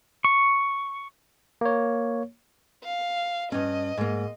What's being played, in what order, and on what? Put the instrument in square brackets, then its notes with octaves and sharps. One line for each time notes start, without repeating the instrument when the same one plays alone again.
[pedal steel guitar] C#6
[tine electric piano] A#3 C#5
[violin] F5
[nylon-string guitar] G2 C#4 [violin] D#5
[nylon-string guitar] G#2 A#3